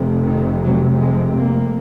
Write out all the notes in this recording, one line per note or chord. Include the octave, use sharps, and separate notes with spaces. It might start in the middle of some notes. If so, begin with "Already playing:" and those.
Already playing: F1 F2 C3
D#3
F#3
G#3
A#3